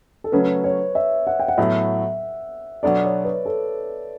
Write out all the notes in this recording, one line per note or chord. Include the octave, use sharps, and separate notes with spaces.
A4
C#3 F#3 A3 C#4 B4
C#5
E5
F#5
G5
F#5
A2 F#3 B3 E5
B2 F#3 B3 D4 A4 D5
C#5
B4
A4